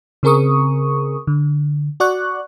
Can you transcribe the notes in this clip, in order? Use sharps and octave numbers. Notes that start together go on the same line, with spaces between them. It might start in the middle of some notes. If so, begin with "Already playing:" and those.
C#3 C4 G#4 A#4 C#6 D#6
D3
F#4 D5 C#6 F#6